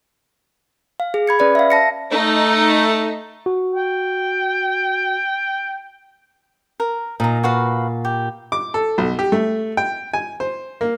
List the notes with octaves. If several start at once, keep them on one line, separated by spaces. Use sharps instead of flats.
F5
G#4
B5 G#6 C#7
C#4 B4 D5 B5
E5 F5
A5 A#6 C#7
A3 D#4
F#4
G5
A#4
A#2 D#4 A#5
F#4 B4 F5
G4
D6
A4
B1
G4
A3
G5
G#5
C5
A#3